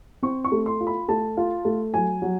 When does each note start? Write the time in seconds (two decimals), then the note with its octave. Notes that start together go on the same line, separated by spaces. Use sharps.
0.23 C4 C#6
0.45 C#6
0.52 A3
0.66 C6
0.81 F4
0.87 B5
1.08 A3 A5
1.37 F4
1.65 A3
1.94 F#3 G#5
2.22 F#3